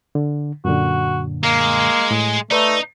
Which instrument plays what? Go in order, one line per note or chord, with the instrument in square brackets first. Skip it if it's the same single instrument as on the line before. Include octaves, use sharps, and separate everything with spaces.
[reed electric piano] D3
[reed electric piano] F#2 A#2 D3 [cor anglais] F#4
[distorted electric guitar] G#3 [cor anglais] A#3
[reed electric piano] A2
[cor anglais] A3 [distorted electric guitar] D#4 [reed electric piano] B4 D5